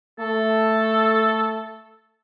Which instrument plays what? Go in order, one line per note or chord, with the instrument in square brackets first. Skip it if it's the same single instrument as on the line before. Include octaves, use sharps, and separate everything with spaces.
[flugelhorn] A3 [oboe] A4